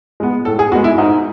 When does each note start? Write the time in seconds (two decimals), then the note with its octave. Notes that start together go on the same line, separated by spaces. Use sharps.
0.20 G#3 B3
0.45 A2 A4
0.59 G#4
0.72 B3 F#4
0.75 G#3
0.84 E4
0.98 G#2 D#4